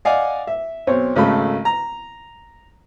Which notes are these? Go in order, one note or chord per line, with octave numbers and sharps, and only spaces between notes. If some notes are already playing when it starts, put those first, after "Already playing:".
D5 D#5 F5 F#5 G#5 D6
E5
B1 C4 C#5
G#1 C#3 A3 A4 B5
A#5